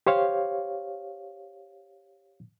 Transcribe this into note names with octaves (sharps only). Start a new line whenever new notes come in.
G4 C5 C#5 F5